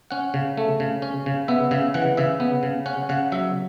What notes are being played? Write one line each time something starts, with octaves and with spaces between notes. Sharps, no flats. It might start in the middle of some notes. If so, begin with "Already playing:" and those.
C#4 F#5
C#3
A3
C#3
C#4
C#3
B3 E5
C#3 E5
E3 F#5
C#3 E5
B3
C#3
C#4 F#5
C#3 F#5
F#3 E5